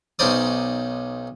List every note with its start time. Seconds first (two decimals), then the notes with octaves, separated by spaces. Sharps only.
0.19 B1 C#4 D#4 C5 D5 D#6